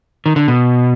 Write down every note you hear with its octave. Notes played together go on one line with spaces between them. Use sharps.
D#3
D3
B2